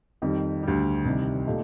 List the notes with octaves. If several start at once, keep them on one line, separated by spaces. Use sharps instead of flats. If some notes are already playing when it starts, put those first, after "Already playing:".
F2 D#3 G3
D2 D3 G3
C2 C3 D#3 G3
A#2 A3 D#4 G4